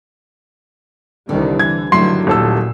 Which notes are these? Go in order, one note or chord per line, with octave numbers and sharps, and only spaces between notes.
C2 D3 D#3 G3
E3 G#6
G2 D3 D#3 F#3 A3 E4 C6 C7
D#1 A#2 A4 E6